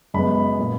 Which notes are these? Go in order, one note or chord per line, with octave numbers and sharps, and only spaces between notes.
F#2 C#3 G#3 B3 B5
A#2 A#3